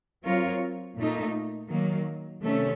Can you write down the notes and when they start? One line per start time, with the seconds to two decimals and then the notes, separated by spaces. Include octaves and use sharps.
0.24 F#3 C4 F4 A#4 C#5
0.97 A#2 A3 D#4
1.69 D#3 F#3 A#3
2.43 C3 D#3 A3 C#4 A4